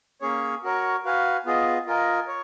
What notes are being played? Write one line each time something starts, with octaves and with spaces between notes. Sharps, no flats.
A#3 C#4 G#4 C#5
F#4 A#4 C#5
F#4 B4 F5 G#5
B3 F4 G#4 D#5
F4 A#4 D#5 G#5
C#5